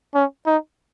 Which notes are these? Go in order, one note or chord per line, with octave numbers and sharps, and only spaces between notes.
C#4
D#4